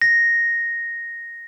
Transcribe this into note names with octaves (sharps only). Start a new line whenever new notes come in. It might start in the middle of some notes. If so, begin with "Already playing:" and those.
A#6